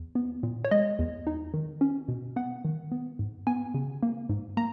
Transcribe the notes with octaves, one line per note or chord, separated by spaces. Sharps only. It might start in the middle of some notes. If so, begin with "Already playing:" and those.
Already playing: E2
B3
A#2
C#5
G#3 D#5
E2
D#4
D#3
C#4
B2
B3 F#5
D#3
B3
G#2
B3 G#5
C#3
A#3
G#2
A#3 A#5